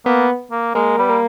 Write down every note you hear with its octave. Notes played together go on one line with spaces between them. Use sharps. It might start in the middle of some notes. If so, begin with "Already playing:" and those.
A#3 B3
A#3
G#3 A#3
G3 B3
A#3